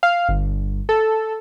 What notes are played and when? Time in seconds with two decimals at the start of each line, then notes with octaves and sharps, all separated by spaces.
0.03 F5
0.29 G1
0.89 A4